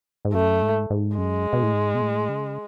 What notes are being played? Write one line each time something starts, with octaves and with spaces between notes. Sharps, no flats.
G#2
F#2 A3
G#2
G#2
F#2 G#3
B2
A2
G#2
B2
A2
C#3